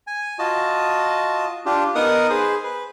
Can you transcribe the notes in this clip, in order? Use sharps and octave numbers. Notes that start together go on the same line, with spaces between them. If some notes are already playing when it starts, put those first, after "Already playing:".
G#5
F4 F#4 D#5 A5
D4 F4 G4
B3 D#4 A#4 F#5 D#6
G#4 B4 C5
B4